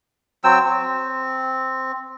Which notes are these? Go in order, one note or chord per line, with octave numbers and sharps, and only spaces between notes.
F#3 C4 G5 E6
C4